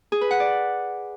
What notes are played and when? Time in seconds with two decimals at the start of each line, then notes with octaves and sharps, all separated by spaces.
0.12 G#4
0.21 B4
0.31 F#5
0.40 D5